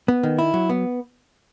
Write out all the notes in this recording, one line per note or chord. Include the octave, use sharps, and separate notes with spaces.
B3
D#3
E4
F#3
B3